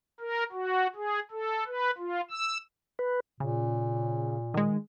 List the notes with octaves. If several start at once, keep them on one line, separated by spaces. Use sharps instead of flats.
A#4
F#4
G#4
A4
B4
F4
E6
B4
A#2 C#3
D#3 G#3